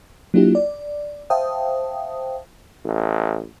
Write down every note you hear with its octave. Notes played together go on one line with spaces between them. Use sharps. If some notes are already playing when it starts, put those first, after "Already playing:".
F#3 A#3 D4 E4 F4 G4
D5
C5 E5 F5 G5 A5 D#6
A1